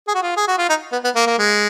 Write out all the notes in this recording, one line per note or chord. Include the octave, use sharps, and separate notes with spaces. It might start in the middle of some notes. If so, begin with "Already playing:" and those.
G#4
F#4
F4
G#4
F#4
F4
D#4
B3
B3
A#3
A#3
G#3